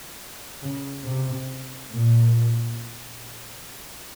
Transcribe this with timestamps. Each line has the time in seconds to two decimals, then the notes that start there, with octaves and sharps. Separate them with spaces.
0.63 C#3
1.06 C3
1.91 A#2